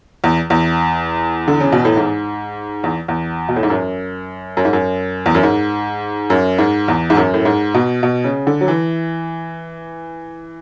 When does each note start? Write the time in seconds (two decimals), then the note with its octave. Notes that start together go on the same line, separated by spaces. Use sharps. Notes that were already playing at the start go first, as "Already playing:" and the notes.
0.24 E2
0.50 E2
1.48 D3
1.60 C#3
1.72 B2
1.85 A2
1.97 G#2
2.84 E2
3.08 E2
3.49 B2
3.56 A2
3.63 G#2
3.70 F#2
4.57 F#2
4.65 G#2
4.73 F#2
5.26 E2
5.35 F#2
5.43 G#2
6.30 F#2
6.59 G#2
6.88 E2
7.10 G#2
7.17 F#2
7.34 A2
7.45 G#2
7.74 B2
8.03 B2
8.24 C#3
8.47 D3
8.61 F#3
8.68 E3